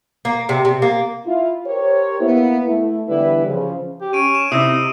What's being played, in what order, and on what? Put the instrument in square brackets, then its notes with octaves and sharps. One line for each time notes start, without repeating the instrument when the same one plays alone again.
[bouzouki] A#3
C3
C3
A#3
[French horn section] E4 F4
G4 A#4 C5 C#5
A#3 B3 E4
A3 E4
D3 E3 G3 B3 E4 B4
C#3 F3
[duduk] G4
[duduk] C#4 [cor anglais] C#5 [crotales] D7 D#7
[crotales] E7
[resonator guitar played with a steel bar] C3 [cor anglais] D#4 [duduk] E4 [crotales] D#6 E6